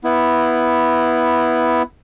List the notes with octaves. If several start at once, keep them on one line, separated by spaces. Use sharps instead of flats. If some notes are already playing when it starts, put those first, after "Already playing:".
B3 E4